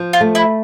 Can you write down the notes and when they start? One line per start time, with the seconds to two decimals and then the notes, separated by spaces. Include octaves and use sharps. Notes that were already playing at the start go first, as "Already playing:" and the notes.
Already playing: F3
0.13 F4
0.21 A3
0.35 E4